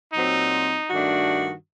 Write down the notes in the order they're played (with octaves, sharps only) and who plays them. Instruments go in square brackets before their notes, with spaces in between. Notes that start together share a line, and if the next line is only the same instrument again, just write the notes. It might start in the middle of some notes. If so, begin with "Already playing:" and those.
[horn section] A#2 F#3 C4 F#4 [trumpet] D#4
[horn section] G2 D#3 A3 D4 F#4